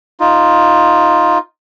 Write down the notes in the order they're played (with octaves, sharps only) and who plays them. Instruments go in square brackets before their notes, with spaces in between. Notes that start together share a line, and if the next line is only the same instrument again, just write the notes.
[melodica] D#4 F4